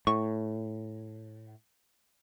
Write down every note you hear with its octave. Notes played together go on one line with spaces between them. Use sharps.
A2 C#6